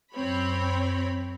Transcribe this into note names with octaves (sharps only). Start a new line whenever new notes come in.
F#2 C4 C#5 B5